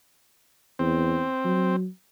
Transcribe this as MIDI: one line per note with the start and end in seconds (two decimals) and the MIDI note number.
0.79 1.24 40
0.79 1.76 60
1.45 1.87 54